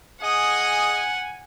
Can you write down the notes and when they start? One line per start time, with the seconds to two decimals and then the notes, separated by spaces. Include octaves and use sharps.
0.23 G#4 D#5 F#5 G#5 D#6